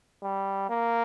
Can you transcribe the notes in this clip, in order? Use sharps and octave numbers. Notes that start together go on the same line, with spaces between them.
G3
A#3